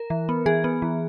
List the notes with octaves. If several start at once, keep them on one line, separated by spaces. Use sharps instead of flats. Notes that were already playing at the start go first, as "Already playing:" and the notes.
Already playing: A#4
E3
B3
E3 G#4
B3
E3